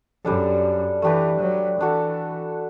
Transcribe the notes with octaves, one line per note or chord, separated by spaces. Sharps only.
F#2 G3 D4 A4
E3 A3 D4 G4 B4
F#3
E3 D4 F#4 A4